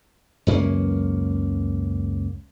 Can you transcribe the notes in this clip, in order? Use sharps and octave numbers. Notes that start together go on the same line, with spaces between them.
C#2 F#2 A#3 C#4